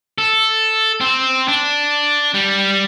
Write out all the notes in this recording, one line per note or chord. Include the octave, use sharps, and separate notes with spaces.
A4
C4
D4
G3